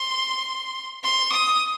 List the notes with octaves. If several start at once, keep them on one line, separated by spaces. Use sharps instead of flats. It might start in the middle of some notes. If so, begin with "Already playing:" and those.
Already playing: C6
C6
D#6